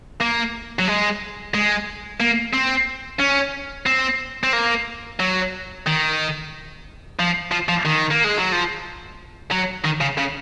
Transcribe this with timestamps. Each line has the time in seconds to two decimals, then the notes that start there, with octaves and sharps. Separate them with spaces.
0.21 A#3
0.79 F#3
0.88 G#3
1.54 G#3
2.20 A#3
2.54 C4
3.20 C#4
3.86 C4
4.43 C4
4.53 A#3
5.20 F#3
5.86 D#3
7.19 F3
7.51 F3
7.68 F3
7.85 D#3
8.11 A#3
8.24 G#3
8.38 F#3
8.52 F3
9.51 F#3
9.85 D#3
10.01 C#3
10.18 C#3